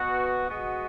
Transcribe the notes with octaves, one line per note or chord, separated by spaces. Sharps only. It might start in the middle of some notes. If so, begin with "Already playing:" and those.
Already playing: B2 B3 F#4
B2 G#3 B3 F#4